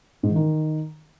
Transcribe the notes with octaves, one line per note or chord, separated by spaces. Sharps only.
G#2
E3
D#3